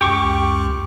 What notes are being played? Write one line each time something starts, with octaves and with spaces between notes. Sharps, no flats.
C#2 F#2 G4 C#6 D6